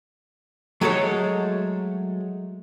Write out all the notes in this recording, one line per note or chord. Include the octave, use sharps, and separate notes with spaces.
F#3 G#3 A3 A4 C#5